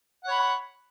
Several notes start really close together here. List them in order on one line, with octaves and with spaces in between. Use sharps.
F#5 C#5 B5